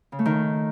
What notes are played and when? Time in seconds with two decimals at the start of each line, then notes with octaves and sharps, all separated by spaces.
0.12 C#3
0.19 A3
0.26 D#3